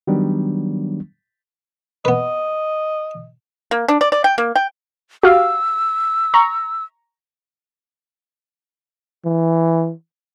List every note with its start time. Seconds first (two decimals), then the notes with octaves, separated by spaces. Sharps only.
0.07 D#3 F#3 G3 B3 D4
2.05 B3 B4 D#5
3.71 A#3
3.88 D4
4.01 D5
4.12 D5
4.24 G5
4.38 A#3
4.56 G5
5.23 F#4 G4 F5 E6
6.34 A#5 C#6
9.25 E3